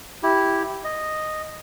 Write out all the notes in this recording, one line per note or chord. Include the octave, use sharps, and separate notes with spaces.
E4 G4
D#5